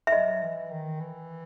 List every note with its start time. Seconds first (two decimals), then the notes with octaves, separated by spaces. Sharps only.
0.07 E5
0.12 F#3 D#5
0.42 E3
0.71 D#3
1.00 E3